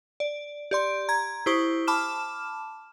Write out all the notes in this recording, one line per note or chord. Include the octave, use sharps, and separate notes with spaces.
D5
G4 D5 C6
A#5 G#6
E4 G4 C5 C#6 D#6
A5 B5 D6 F6 E7